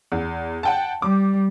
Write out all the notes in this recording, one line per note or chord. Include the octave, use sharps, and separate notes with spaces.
E2
F#5 G5 A5
G3 D6